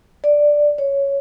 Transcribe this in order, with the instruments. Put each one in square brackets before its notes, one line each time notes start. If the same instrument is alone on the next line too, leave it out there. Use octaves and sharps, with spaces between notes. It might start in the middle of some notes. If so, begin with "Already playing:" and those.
[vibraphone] D5
C#5